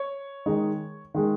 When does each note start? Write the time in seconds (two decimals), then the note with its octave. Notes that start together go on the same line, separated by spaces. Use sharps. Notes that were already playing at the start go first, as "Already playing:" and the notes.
Already playing: C#5
0.46 D#3 G#3 D#4
1.14 D#3 G#3